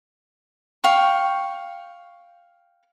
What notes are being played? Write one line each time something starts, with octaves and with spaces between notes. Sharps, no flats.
F5 G5 C#6